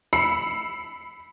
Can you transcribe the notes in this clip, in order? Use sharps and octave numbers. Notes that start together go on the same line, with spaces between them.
B5 E6 C7 C#7